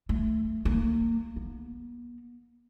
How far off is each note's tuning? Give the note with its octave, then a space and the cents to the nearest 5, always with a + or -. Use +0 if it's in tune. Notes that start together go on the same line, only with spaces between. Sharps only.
A3 +10
A#3 -25
B3 -45